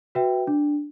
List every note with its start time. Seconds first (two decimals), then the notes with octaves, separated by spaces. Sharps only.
0.15 F#4 B4 E5 G5
0.47 D4